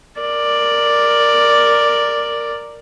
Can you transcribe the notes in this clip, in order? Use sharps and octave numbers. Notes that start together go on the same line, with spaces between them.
A#4 D5